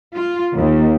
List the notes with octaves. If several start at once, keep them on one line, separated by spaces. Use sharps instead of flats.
F4
D#2